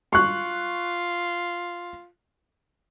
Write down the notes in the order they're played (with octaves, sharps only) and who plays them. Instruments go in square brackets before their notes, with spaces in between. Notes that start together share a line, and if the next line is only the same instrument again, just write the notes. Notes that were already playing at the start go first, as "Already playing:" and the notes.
[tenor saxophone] F4 [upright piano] C#6 F#6